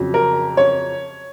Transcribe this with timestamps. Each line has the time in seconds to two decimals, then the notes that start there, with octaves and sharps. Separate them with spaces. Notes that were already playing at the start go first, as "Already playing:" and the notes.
Already playing: F2 C#3 F#3
0.14 A#4
0.57 C#5